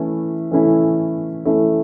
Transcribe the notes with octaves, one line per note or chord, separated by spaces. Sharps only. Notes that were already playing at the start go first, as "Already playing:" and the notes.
Already playing: E3 A3 C#4 E4
E3 A3 C#4 E4
E3 A3 C#4 E4